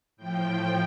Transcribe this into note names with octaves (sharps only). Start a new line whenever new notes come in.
A2 F3 G5